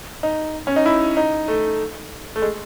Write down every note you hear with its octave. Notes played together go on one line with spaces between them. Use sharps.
D#4
C#4
D#4
E4
D#4
A3
A3
G#3